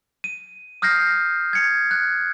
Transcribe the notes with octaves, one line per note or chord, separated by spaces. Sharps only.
D#7
D#6 F6 G6 A#6 C7
G#6 C#7
F#6